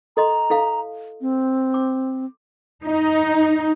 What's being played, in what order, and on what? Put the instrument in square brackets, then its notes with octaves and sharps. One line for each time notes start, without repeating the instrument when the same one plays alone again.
[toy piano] A4 D#5 C6 [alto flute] A#5
[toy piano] E4 A4 F5
[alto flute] C4
[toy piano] D6
[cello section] D#4